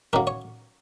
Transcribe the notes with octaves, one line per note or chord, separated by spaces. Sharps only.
F#2 D#3 F#3 A#3 A#4
C#5